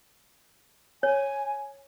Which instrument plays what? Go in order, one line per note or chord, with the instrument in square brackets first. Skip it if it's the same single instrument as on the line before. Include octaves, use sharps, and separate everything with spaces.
[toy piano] C#5 [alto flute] G#5